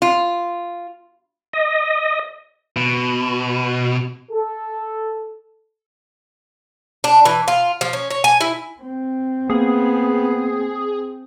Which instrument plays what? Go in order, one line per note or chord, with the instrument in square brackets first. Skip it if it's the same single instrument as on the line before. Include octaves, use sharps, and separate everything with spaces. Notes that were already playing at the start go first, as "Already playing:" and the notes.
[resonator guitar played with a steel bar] F4
[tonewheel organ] D#5
[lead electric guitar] B2
[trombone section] A4
[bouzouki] D4
E3
F4
F3
C#4
C#5
G#5
E4
[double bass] C4
[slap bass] A#3 [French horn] B3 [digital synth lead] G#4